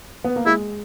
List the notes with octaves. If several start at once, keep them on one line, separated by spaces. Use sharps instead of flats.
B3
A#3
G#3 E4